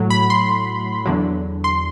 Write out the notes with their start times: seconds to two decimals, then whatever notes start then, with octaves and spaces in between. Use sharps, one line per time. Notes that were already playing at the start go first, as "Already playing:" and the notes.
Already playing: A2 F#3
0.10 B5
0.30 C6
1.06 E2 D3 F#3
1.64 C6